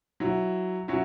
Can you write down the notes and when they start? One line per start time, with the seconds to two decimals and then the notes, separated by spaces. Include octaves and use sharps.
0.20 F#3 E4
0.88 F#3 C#4 E4